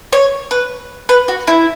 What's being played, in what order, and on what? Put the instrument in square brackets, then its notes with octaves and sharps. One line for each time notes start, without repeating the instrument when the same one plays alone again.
[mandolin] C#5
B4
B4
F#4
E4